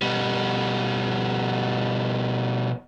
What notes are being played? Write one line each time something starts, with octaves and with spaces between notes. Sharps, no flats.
B2 G3